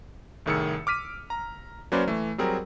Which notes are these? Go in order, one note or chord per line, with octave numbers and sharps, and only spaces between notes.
C2 A2 D#3 G#4 E6 C#7
D6 F6 B6 D#7
A#5
F#3 A#3 C#4 B4 C5 D5
E3 A3
F#3 G3 C4 G#4 A#4